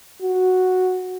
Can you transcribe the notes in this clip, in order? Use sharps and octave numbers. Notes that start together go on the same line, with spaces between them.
F#4